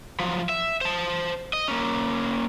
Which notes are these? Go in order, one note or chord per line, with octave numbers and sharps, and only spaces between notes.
F3 F#3
E5
C5 A5
D#5
A#3 C#4